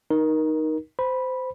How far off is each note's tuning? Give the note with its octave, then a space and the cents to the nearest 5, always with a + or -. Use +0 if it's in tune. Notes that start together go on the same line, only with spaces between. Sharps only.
D#4 +0 A#4 +20
C5 -20 B5 -10